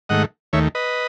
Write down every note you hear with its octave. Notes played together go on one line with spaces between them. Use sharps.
G#2 D#3 A3 D#5 F#5
D#2 D#3 A3 C#5 E5
B4 D#5